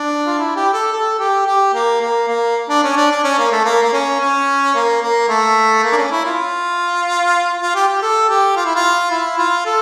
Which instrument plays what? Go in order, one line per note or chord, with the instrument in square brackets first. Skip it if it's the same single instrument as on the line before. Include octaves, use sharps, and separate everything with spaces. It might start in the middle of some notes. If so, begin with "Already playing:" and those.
Already playing: [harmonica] D4
F4
E4
G4
A4
A4
G4
G4
A#3
A#3
A#3
D4
C#4
D4
D4
C#4
A#3
A3
A#3
A#3
C#4
C#4
A#3
A#3
A3
A#3
D4
C#4
E4
F4
F4
G4
G4
A4
G4
F4
E4
F4
E4
F4
A4